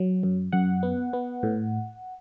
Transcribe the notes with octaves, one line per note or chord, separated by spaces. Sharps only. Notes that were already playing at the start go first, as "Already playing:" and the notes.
Already playing: F#3
F#2
F#2 F#5
B3
B3
A2